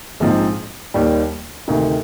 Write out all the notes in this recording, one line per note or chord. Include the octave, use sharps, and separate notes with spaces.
A#1 G#2 F3 C4 D#4
D#2 D#3 G3
D2 C3 D#3